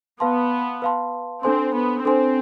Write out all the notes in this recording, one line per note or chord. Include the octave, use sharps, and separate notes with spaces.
B3 B4 F5 A5 C6
B4 F5 A5 C6
C4 D4 A4 C5 G#5 C6
B3
C4 D4 A4 C5 G#5 C6